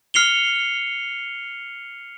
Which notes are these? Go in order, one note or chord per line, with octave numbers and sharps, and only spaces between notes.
F6 C7 C#7 F7 G7